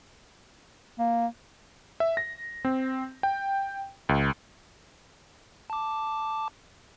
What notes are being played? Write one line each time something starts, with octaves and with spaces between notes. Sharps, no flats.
A#3
E5
A#6
C4
G5
C#2
A5 D6